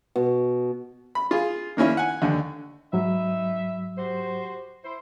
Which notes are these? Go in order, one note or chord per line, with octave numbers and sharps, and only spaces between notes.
B2
B5
F4 G#4
D#3 A#3 C#4 E4
F#5 G#5
D#2 D3
G#2 F#3 D#4 B4 E5
F#4 G4 C5
E4 C5